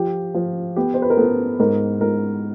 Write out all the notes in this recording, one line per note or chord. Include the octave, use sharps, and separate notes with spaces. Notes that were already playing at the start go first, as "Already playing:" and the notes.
Already playing: F3 G4
F3
B3 G4
C5
B4
A#4
B3 A4
G#2 A#4
G#2 A#4